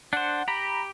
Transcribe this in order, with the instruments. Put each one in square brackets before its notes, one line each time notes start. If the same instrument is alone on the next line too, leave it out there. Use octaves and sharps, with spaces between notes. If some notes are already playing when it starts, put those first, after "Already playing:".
[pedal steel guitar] D4 C5 [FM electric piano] F#5
[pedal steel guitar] G4 [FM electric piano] A#5 B5